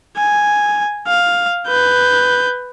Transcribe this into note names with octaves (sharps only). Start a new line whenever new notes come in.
G#5
F5
B4 G6